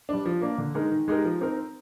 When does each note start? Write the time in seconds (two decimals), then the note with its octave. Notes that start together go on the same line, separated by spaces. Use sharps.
0.09 G3 D4
0.25 F3
0.42 A#3 D4
0.58 D3
0.74 G#3 D#4 A#4
0.91 D#3
1.08 G#3 D#4 G4 A#4
1.24 F3
1.41 C4 D#4 A#4